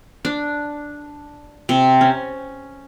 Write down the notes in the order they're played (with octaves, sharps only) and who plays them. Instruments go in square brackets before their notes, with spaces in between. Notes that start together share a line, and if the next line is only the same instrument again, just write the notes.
[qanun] D4
C3
C#4